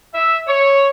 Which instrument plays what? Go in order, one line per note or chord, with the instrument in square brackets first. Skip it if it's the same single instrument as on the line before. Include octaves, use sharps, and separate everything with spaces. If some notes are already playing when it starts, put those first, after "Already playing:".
[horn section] E5
C#5